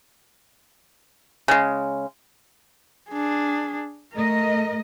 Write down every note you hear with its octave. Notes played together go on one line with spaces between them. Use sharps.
C#3 G#3
D4 G#4
A3 A#4 D#5